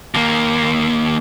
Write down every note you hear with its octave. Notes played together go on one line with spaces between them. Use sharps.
D#2 A#3